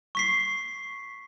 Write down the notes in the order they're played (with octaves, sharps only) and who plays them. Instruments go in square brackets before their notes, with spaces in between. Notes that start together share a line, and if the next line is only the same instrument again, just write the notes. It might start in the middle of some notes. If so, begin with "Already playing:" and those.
[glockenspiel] C#6 B6 C7